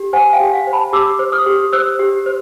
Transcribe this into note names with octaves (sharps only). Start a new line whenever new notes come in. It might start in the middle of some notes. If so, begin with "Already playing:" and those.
Already playing: G4
C5 F#5 G#5
F5 G5
G4
F#5
C5
A5 B5
G4 D6 E6
C5
D#6 F6
G4
C5 E6 F#6
G4
C5